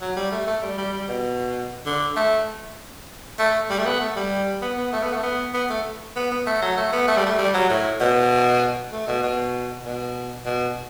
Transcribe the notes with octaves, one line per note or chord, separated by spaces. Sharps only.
F#3
G3
A3
A3
G3
G3
G3
B2
D3
A3
A3
G3
A3
B3
A3
G3
B3
B3
A3
B3
A3
B3
B3
A3
B3
B3
A3
F#3
A3
B3
A3
G3
A3
G3
F#3
A2
B2
A3
B2
B2
B2
B2